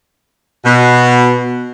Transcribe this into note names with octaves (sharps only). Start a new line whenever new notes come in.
B2